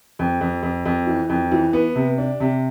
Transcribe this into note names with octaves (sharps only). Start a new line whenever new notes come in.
F2
F2
F2
F2
E3
F2
E3
B3
C3
D4
C3